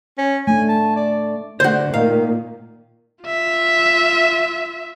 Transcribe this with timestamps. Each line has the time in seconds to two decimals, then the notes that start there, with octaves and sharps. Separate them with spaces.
0.18 C#4
0.47 A3 D4 G#5
0.69 A5
0.96 D5
1.60 D3 A3 F#4 C5
1.94 A#2 D#3 F5
3.25 F4 E5